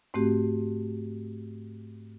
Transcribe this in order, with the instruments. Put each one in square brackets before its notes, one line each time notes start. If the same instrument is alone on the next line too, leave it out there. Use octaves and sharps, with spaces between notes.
[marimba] G#2 A3 C4 F#4 G4